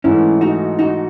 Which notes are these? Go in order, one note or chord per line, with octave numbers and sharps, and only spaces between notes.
G#2 E3 A3 C#4 E4
D#4 F#4
D#4 F#4